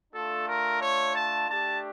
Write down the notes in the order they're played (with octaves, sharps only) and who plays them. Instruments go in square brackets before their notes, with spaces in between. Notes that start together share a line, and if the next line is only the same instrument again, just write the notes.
[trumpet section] A3 D4 F4 A4
A#4
C#5
A5
A3 D4 G4 A5